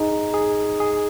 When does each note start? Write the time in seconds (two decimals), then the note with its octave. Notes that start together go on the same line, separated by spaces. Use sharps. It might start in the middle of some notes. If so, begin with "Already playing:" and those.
Already playing: D#4 G#4
0.34 G#4
0.80 G#4